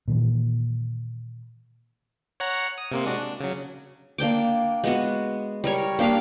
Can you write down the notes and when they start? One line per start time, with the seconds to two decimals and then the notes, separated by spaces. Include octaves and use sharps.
0.08 A#2 D#3 E3
2.40 C#5 F#5 A#5
2.78 D#6
2.92 C3 A#3 C4
3.06 G#3 D4 F#4
3.18 D4
3.40 C#3 F#3
4.18 A#3 D4 G5 D6
4.84 G#3 B3 F#4
5.64 G3 A#4 C#5
5.99 A#3 D4 G4 F5